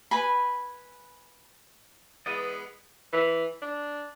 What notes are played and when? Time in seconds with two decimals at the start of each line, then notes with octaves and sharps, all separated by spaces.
0.11 B4 G#5 B5
2.26 E3 G#3 B3 D5 D#5
3.13 E3
3.62 D4